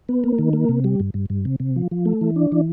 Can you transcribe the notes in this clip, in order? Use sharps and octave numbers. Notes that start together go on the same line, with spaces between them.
B3
A#3
D#3
A#3
C3
G3
G2
G2
G2
C3
C3
F3
F3
A3
E3
D4
E3